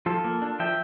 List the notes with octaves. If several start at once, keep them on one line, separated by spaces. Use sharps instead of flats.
F3 F4 A4
A#3
D4
F3 E5 G5